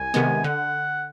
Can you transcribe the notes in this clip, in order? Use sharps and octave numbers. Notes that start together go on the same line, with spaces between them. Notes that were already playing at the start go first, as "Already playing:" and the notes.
Already playing: C2 G#5
C3 D#3 G#3 B3
D3 F#5